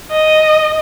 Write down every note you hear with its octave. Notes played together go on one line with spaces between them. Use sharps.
D#5